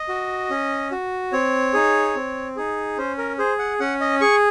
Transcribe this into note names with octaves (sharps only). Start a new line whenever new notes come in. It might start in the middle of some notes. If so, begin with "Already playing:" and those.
Already playing: D#5
F#4
C#4
F#4
C4 C#5
D#4 G#4
C4
D#4 G#4
C#4 C5
A#4
G#4 C5
F#5
C#4 F#5
D#5
G#4 C#6